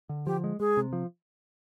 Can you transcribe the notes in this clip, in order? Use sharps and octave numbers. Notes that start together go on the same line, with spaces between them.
D3
F3 G4
G#3
G#3 G#4
C3
F3